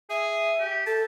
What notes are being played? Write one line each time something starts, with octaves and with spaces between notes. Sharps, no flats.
G#4 E5
G4
A4 A5